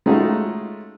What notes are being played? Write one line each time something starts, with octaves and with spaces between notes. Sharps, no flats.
G#3 A3 C#4 D#4 F4 F#4